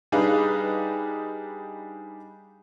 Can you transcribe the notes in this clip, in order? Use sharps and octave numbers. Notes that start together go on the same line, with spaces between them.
G3 D4 D#4 G#4 B4 F5